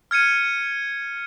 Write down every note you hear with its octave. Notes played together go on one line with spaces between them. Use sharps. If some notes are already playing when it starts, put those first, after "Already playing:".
F6 G#6 C#7 D#7